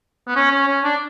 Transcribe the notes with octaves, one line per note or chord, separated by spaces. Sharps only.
B3
C#4
C#4
C#4
D4